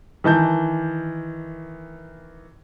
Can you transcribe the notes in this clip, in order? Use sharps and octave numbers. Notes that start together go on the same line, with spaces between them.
D#3 E3 A5 G6